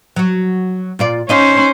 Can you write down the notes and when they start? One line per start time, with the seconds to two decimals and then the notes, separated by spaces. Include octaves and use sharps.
0.16 F#3 F#4
0.99 A#2 F4 D5
1.29 C#4 D#4 C5 D#5 F5